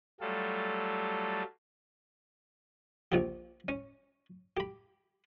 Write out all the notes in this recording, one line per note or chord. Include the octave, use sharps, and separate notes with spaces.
F#3 G3 A3 F4 A4
A#1 F3 G4
C#4
G4 B5